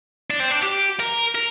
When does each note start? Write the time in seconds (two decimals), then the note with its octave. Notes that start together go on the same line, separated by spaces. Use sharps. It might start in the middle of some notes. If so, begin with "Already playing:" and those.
0.30 D4
0.40 C4
0.51 D4
0.63 G4
1.00 A#4
1.35 A#4